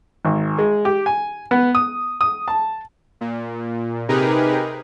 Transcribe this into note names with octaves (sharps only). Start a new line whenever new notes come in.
G#1
G#3
G4
G#5
B3
D#6
D#6
A5
A#2
C3 D#4 G4 G#4 A#4 B4